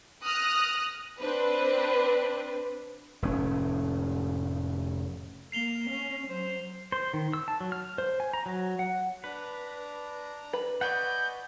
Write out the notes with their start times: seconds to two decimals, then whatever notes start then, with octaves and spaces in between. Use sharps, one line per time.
0.24 D#6 F6 F#6 A#6
1.20 C4 D4 B4 C5
3.22 F1 A2 C#4
5.52 A#3 C7 F7 G7
5.90 C#4
6.27 F#3 C5
6.92 C5
7.14 D#3
7.33 E6
7.48 A5
7.60 F#3
7.72 F6
7.98 C5
8.20 G#5
8.34 A#5
8.46 F#3
8.79 F#5
9.24 D4 B4 A#5
10.53 B4
10.81 D5 D#5 F#5 G#5 B5 C#6 G6